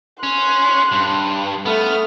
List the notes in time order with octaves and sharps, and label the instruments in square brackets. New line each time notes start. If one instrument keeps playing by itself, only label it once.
[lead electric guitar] C#4 [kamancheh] C6 F#6
[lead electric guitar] G2
[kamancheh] A3 F6 [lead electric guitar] B3